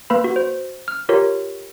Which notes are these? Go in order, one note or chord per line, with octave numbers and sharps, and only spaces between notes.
A#3 B4 B5
F#4
C5
F6
F4 G4 A#4 C#5